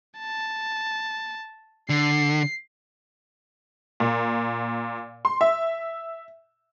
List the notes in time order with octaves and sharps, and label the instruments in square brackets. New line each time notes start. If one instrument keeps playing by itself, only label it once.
[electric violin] A5
[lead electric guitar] D3 [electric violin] C7
[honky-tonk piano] A#2
C6
E5